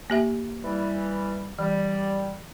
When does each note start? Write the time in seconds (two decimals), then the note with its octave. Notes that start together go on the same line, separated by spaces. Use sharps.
0.10 A#3 G4 E5
0.64 E3 G3
1.59 E3 G3